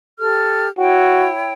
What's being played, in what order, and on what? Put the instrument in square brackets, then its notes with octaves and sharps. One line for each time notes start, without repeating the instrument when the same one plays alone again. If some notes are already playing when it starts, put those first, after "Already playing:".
[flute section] G4 A4 F6
[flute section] E4 C#5 G5 [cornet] F#4